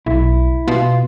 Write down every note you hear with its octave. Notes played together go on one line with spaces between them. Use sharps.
B1 E4
B2 F4